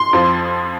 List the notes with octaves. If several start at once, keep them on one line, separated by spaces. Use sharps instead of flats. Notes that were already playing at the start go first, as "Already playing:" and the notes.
Already playing: C6
F2 F3